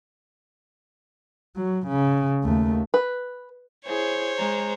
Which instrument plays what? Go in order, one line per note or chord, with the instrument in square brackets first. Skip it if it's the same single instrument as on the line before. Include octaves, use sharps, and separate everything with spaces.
[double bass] F#3
C#3
D#2 A3
[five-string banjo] B4
[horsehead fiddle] E4 G#4 [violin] C5 C#5
[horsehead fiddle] G#3 A#5